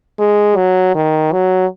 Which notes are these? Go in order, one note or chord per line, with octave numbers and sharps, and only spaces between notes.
G#3
F#3
D#3
F#3